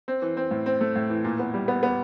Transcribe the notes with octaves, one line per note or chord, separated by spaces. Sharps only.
C4
E3
C4
A2
C4
A3
A2
E3
A#2
B3
G3
B3
B3